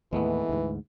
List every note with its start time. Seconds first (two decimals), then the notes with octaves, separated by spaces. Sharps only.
0.13 D#2 A2 E3 G#3 A3 B3
0.49 D2 G#2